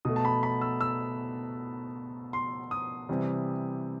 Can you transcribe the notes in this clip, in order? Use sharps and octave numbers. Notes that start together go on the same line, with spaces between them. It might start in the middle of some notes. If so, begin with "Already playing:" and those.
B2 A3 D#6
A5
B5
B5
E6
E6
C6
D#6
C3 E3 G3